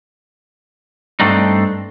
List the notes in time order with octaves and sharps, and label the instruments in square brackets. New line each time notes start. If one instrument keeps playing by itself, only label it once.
[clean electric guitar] G2 A3 C4 D4 D#4